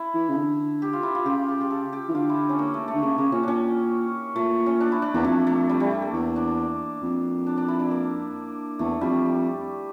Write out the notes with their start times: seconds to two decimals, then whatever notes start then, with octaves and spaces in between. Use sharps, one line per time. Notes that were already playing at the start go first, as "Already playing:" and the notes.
Already playing: E4
0.15 E3
0.29 C#3
0.37 D3
0.82 G4
0.93 F4
1.03 E4
1.15 F4
1.26 C#3 G4
1.48 G4
1.61 G4
1.71 A4
1.93 G4
2.09 E3
2.14 D3 F4
2.29 E4
2.49 C#4
2.59 A#3
2.74 A3
2.88 A3
2.95 D3
3.03 C#3 A#3
3.18 C#3 A#3
3.32 A#2 C#4
3.43 A#2 C#4 D4
4.36 A#2 A3
4.66 C#4
4.80 D4
4.92 E4
5.02 D4
5.14 E2 A#3
5.24 F2 A3
5.47 A3
5.69 G3
5.80 G3
5.91 A3
6.02 A#3
6.13 E2
6.36 D4
7.02 F2
7.47 D4
7.57 D4
7.68 E4
7.79 D4
7.91 A#3
8.79 E2 A3
9.01 F2 G3